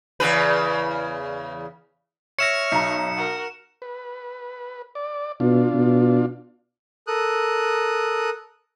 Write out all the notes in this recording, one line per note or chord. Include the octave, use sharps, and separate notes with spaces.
E2 C#3 B4
C#5 E5 C#6 F6 A#6 C#7 E7
B1 A#5
F#4 A#4
B4
D5
B2 D4 F4
B2
A4 A#4 D#6 F#6